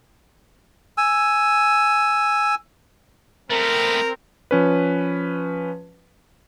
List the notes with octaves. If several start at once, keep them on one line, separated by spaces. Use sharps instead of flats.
G#5 E6
A3 B3 C4 A#4
F3 C#4 B4